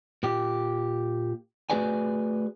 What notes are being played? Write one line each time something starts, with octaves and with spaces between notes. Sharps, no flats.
A#2 G4
A3 F#4 G#4 B4 D5 G#5